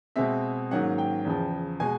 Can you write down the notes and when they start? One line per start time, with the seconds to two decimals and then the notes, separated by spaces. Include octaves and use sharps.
0.16 B2 G#3 C4 E5
0.71 G#2 D#3 F#3 A#3 C#4 F#5
0.98 G5
1.25 E2 C#3 F3
1.80 B2 G#3 G#5